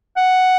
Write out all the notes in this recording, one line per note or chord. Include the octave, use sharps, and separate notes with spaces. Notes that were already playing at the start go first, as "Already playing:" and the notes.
F#5